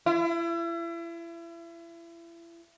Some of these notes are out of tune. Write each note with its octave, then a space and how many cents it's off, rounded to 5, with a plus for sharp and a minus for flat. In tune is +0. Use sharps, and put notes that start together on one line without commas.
E4 +35